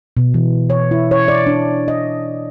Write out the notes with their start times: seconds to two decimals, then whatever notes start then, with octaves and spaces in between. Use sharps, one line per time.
0.17 B2
0.34 E3
0.70 C#5
0.91 E4
1.11 C#5
1.28 D5
1.47 D4
1.88 D#5